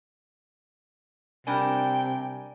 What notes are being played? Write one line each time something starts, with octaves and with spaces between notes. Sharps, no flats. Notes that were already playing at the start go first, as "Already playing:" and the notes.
C3 G3 D4 A#4 G5 G#5